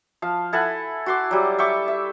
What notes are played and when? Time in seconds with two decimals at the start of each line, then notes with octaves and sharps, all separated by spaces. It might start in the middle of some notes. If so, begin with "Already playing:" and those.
0.22 F3 F5
0.53 E4 A4 F#5 G#5
1.06 F#4 C6 D6
1.31 F#3 G3
1.59 E5 G5 C#6 D6
1.88 E5